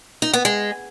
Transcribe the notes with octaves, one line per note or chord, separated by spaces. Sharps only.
D#4
B3
G#3